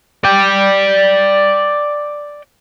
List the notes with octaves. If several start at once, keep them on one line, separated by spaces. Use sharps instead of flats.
D5 G5